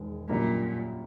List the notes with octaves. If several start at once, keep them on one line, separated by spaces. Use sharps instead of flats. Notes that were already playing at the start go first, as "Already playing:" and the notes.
Already playing: E1 D#3 G#3
F#2 A#2 D3 G3 A#3